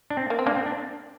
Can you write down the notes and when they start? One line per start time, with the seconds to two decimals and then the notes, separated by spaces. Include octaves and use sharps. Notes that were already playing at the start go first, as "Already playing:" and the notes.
0.10 D4
0.17 C4
0.30 A#3
0.39 C4
0.46 A#3 D4
0.56 C4
0.66 D4